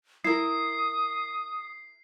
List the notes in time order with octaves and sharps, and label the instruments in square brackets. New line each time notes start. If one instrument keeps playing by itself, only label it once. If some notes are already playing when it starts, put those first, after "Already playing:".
[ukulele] E4 A#4 [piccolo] D#6 [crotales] C7